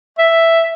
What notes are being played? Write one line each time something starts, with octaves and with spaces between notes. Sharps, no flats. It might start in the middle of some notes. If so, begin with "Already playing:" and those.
E5